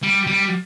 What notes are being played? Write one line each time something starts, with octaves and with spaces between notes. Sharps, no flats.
G3
G3